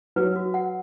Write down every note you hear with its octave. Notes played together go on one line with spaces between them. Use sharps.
F#3 B4
F#4
F#5